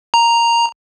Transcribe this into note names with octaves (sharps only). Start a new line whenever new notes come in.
A#5